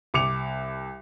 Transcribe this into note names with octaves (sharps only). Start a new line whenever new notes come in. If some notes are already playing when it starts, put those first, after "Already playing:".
C2 D6 C#7 F7